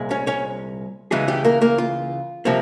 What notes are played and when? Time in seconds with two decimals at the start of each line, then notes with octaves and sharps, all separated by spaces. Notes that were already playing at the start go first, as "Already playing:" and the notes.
Already playing: C2 A#2 G#3
0.11 C#4 C#5
0.27 C#4 C#5
1.11 C#2 C#3 E3 G#3 G#4
1.28 G3 G4
1.44 A#3 A#4
1.61 A#3 A#4
1.78 F4
2.45 C3 F3 A#3